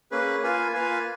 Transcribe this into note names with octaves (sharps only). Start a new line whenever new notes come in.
A#3 C#4 G#4 B4
A#3 F4 B4 F5 G#5
A#3 F4 B4 F5 G#5